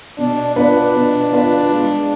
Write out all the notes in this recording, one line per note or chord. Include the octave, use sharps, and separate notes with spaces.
B2 D4
B3 D4 F4 B4 D5
B2
B3 F4 B4 D5
G#3